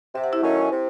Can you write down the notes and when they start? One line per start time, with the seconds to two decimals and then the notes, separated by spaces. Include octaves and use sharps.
0.15 C3 E5
0.24 F#5
0.33 E4 E5
0.43 D#3 F#3 A3 C#4
0.72 C3